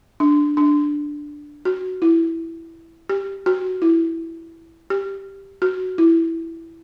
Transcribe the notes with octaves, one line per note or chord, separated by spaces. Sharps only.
D4
D4
F#4
E4
G4
F#4
E4
G4
F#4
E4